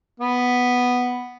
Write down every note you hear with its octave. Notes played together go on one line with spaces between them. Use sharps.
B3